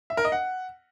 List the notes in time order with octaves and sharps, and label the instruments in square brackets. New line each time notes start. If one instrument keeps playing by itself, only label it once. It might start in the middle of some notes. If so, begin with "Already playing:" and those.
[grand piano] E5
A#4
D#5
F#5